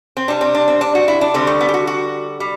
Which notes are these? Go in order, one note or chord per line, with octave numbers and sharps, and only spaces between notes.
C4
C3 G3 D4
C4
D4
C4
D4
F#4
E4
D4
D3 G3 C4
A3
B3
G4
F#4
F#4
G3